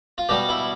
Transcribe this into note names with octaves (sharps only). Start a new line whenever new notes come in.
F4
B2 G3 G4
E4